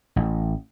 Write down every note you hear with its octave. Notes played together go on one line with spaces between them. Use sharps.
A1